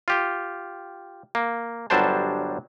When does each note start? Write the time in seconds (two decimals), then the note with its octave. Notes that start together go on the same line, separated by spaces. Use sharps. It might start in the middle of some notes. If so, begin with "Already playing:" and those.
0.08 F4 G4
1.35 A#3
1.90 G1 F#3 G3 D4 C5 A5